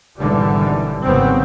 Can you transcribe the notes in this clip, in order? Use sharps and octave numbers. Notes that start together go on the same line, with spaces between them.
G#1 B2 D3 E3 G3
G#1 C#3 F#3 B3 C4